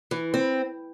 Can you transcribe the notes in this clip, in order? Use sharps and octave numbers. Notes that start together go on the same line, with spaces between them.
E3
C4